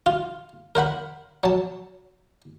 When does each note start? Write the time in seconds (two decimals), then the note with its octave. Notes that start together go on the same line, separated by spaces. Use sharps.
0.06 F4
0.75 A#4 C5 F#5 B5
1.44 F#3 A5